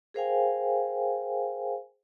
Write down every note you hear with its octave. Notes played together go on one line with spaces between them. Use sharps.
G#4 A#4 C5 F5 G5 G#5